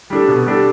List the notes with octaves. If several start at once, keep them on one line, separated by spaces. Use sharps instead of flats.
G3 D4 A4
B2
G3 D4 A4